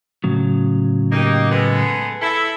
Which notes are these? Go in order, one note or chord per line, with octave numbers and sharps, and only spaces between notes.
A2 C#3 F#3
A#3 D#4 G4
G#3 B3 A4
E4 A4